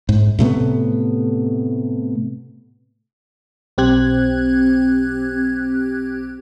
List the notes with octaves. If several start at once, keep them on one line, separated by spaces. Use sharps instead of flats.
G#2
A2 C3 A3 B3
B1 C4 G4 F#6 G#6